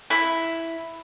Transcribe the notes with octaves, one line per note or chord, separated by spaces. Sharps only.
E4